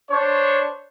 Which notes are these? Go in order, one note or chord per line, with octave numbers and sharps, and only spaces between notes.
D4 C5 C#5